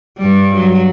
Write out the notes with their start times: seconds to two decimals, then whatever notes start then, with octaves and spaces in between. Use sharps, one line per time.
0.18 G2 G3
0.55 F#3